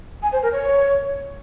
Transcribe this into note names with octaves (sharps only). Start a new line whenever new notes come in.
G#5
C5
A#4
C#5